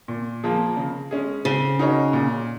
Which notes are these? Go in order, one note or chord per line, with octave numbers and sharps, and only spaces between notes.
A#2
F3 A#3 F4 G#4
C#3
G#3 C#4 G#4
C#3 C4
D#4 F#4 A#4 C#5
A#2